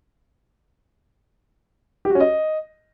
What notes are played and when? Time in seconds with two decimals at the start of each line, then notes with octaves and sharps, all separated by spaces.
2.05 G4
2.10 F#4
2.15 C#4
2.20 D#5